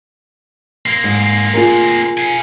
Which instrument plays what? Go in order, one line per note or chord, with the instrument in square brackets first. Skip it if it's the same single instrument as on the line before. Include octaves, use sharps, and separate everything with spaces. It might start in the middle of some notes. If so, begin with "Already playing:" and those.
[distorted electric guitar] A#3 C4
[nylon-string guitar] G#2
F4 G#4 A#4
[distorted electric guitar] F5 G#5